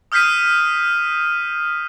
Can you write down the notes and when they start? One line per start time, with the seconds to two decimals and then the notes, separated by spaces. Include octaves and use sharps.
0.12 D#6 F6 G6 B6 C7 D#7